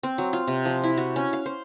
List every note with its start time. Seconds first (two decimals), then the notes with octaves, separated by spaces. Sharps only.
0.03 C4
0.18 F#3
0.33 F4
0.47 C3
0.65 F3
0.83 E4
0.98 F#4
1.16 C#4
1.33 F5
1.46 C5